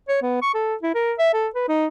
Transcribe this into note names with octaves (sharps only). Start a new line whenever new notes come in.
C#5
B3
C#6
A4
E4
A#4
E5
A4
B4
D#4